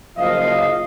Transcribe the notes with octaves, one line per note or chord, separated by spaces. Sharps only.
F#1 F3 D#5 F5